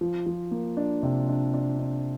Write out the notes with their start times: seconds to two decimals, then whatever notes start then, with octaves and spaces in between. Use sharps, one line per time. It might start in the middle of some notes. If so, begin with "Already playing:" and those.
0.01 F3
0.26 F3
0.51 A#3
0.77 D4
1.03 C3
1.29 D4
1.54 D4
1.79 D4